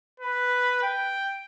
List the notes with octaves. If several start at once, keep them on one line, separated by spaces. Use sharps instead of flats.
B4
G5